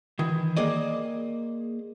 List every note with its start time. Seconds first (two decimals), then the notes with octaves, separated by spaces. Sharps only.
0.19 D#3 E3
0.57 A#3 G#4 D5 D#5